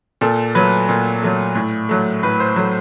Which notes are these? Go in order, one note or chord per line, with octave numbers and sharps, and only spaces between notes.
A#2 A4
F#3 A3 B4
A#2
F#3 A3
A2
F#3 A3
A2 B4
C5
F#3 A3